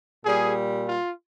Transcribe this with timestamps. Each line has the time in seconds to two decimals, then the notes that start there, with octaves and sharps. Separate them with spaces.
0.24 A#2 G3 G#4
0.86 F4